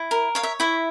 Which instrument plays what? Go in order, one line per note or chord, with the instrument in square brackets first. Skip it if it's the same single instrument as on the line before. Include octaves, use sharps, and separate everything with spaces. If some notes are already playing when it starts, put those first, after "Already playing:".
Already playing: [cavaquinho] E4
A#4
C#5 F5
E5
E4 E5